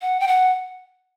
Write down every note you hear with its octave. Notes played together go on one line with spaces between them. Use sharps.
F#5
G5
F#5